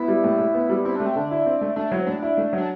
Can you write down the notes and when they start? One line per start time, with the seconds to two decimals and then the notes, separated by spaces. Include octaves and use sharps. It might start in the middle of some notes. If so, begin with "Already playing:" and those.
Already playing: B3 E4
0.08 G3
0.24 A2
0.39 A2
0.54 B3
0.70 G3
0.85 C4 E4
0.96 A3 D4
1.06 C4
1.16 D3 D4
1.31 E4
1.46 C4
1.61 A3
1.76 A3 D4
1.92 F#3 E4
1.99 C4
2.07 A2 D4
2.22 E4
2.37 A3
2.53 F#3 D4